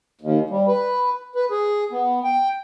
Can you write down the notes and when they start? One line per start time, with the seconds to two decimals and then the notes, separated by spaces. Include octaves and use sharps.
0.21 D#2
0.50 G3
0.68 B4
1.35 B4
1.51 G#4
1.91 B3
2.24 G5